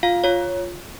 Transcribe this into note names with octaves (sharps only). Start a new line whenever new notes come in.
F4 F5
F4 C#5